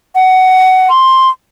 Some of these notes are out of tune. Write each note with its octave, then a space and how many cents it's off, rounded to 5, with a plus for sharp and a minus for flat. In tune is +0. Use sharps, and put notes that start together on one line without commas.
F#5 +15
C6 +5